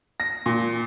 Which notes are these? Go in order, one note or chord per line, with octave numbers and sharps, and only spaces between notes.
A#6
A#2